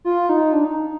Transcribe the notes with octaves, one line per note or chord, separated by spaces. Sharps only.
F4
D#4
D4
D#4